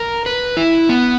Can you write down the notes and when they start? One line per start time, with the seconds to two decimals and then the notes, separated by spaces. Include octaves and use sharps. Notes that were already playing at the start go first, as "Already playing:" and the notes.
Already playing: A#4
0.26 B4
0.57 E4
0.89 B3